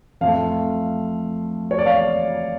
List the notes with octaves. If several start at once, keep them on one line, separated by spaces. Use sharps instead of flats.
F2 F3 A3 F5
C#5
D5
F5